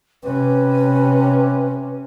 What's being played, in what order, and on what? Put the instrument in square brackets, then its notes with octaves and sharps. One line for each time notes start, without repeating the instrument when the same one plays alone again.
[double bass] C3 C#4 [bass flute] B4